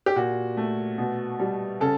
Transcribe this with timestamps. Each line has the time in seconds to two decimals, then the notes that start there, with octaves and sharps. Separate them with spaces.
0.06 G4
0.16 A#2 F#4
0.57 A3
0.98 B2
1.40 G3
1.81 C#3 A4